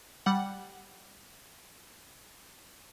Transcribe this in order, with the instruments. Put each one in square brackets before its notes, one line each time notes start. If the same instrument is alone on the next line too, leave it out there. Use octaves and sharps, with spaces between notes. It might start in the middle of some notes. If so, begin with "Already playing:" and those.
[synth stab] G3 F#5